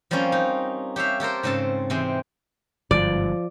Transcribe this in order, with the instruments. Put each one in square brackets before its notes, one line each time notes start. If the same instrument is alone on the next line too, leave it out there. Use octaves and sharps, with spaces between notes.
[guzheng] F3 G3 A#3 C4 C#4
D#4
G4 C#5 E5 F5
G4 A4 A#4 C5
G#2 C#3 C4 A4 A5
C3 E3 G#3 C4
[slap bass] G1 G#2 [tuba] F3 [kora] D5